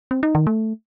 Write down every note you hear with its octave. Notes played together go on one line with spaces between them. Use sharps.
C4
D#4
D#3
A3